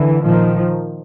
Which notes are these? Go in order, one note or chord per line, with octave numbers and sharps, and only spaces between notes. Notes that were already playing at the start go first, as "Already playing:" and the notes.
Already playing: D3 E3
A#2 D#3 F3